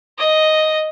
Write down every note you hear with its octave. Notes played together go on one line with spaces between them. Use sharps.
D#5